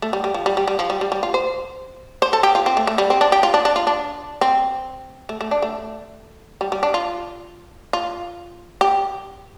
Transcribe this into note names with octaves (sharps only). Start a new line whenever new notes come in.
A3
G3
G3
F3
G3
G3
G3
F3
G3
G3
G3
F4
C5
C5
A4
G4
F4
C4
A3
A3
G3
C4
D4
G4
F4
D4
D4
F4
D4
C4
A3
A3
D4
A3
G3
G3
D4
F4
F4
G4